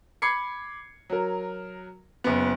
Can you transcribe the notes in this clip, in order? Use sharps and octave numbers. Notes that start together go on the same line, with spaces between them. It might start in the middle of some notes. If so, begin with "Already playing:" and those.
B5 D6 G#6 C7 C#7
F#3 A#4
F#1 B3